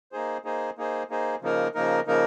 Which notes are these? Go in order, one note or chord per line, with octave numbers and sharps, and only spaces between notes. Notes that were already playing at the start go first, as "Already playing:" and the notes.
A#3 D#4 G#4 C5
A#3 D#4 G#4 C5
A#3 D#4 G#4 C5
A#3 D#4 G#4 C5
C#3 F3 A#3 D#4 A#4
C#3 F3 A#3 D#4 A#4
C#3 F3 A#3 D#4 A#4